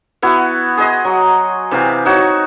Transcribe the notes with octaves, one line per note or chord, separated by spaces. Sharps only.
B3 E4 F#4
G#4 D#5 C6
F#3
C3 E3 G4 F5
D#4 F#4 C#5